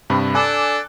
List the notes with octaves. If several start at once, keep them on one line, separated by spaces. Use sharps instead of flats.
G2 C3 B5
D4 A4 G#5 D6 F#6